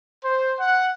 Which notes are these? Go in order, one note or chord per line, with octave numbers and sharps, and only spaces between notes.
C5
F#5